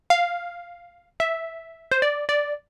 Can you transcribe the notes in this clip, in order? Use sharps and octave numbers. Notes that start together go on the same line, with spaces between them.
F5
E5
C5
D5
D5